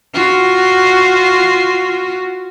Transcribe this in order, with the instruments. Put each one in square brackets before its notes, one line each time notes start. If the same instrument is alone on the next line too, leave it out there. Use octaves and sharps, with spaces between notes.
[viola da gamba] F4 F#4